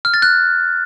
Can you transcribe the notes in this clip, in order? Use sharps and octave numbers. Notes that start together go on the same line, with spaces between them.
F6
A6
F#6